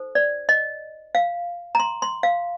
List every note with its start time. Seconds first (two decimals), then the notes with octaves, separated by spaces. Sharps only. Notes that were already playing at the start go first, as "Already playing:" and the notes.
Already playing: D#4 A4 C5
0.15 D5
0.49 D#5
1.15 F5
1.75 A#5
1.80 C6
2.02 C6
2.23 F5